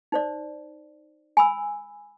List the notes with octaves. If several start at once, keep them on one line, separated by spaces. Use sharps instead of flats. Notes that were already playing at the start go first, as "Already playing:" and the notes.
D#4 C5 D5
G#5 B5 E6